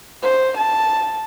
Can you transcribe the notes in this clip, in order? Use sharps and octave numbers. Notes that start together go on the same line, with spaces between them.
C5
A5